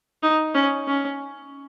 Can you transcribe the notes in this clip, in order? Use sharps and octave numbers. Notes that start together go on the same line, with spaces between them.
D#4
C#4
C#4